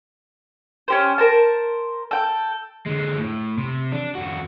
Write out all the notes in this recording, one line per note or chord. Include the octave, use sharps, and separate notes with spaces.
C#4 G4 C5
A#4 C5 A5
A4 G5
D3 G#3
A2
C3
D4
F2 F#4